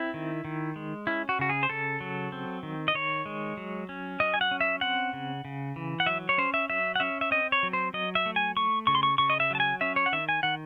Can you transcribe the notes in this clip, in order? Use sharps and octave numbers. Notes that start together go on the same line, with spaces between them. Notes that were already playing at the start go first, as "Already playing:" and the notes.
Already playing: C4 E4
D#3
D#3
G#3
C#4 E4
F#4
C#3 F#4
G#4
C5
C#3 A4
F#3
C4
D#3
D#5
D#3 C#5
G#3
F#3
C#4
F#3 D#5
G#5
F#5
C#4
E5
C4 F#5
C#3
C#3
E3
F#5
F#3 E5
C#5
C#4 C5
E5
F#3 E5
F#5
C#4 E5
E5
C4 D#5
C#5
F#3
C5
F#3 D#5
E5
A3
G#5
A3 C#6
C#3 C#6
C6
C#6
C#3 C#6
D#5
E5
F#3 A5
G#5
C#4 E5
C#5
F#5
D#3 E5
G#5
D#3 F#5